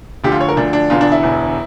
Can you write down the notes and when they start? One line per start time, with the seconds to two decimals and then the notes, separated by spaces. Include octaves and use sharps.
0.24 D2 D3 F3 G4
0.32 F4
0.41 C#5
0.49 A#4
0.57 D2 D3 F3 D4
0.73 D4
0.90 E1 E2 D3 F4
1.01 D4
1.12 E4
1.23 E1 E2 D3